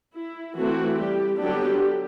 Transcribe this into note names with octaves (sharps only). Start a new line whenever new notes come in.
E4
E3 A3 C4 F#4
G3 G4
D3 F#3 G3 B3 D4 G4